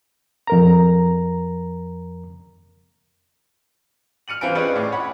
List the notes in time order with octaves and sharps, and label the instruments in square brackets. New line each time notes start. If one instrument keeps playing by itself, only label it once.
[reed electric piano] F2 A#4 A#5
[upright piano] F6 C#7 D#7 F#7
G2 E3 C4 F5 G#5 D7
C#4 F4 G#4 B4 D5 D#5
A2 D6
C#5 F#5 B5